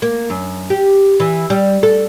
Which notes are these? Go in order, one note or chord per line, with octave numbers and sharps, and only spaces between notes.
A#3
F#2
G4
E3
G3
A4